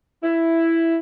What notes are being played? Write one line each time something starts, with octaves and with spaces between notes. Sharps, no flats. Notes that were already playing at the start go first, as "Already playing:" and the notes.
E4